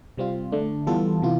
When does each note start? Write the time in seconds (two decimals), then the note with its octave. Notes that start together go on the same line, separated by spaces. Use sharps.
0.17 C3 G3 C4 F4
0.52 D3 A3 D4
0.87 E3 G3 B3 F4 A4
1.22 C3 E3 B3 F4